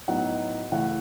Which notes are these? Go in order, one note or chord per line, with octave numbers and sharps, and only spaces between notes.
A2 F#3 B3 D#4 F#5
C#3 E3 A3 F#5